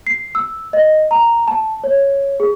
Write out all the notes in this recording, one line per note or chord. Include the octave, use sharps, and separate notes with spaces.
C7
E6
D#5
A#5
A5
C#5
G#4